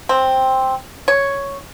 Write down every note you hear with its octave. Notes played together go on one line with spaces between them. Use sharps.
C4
C#5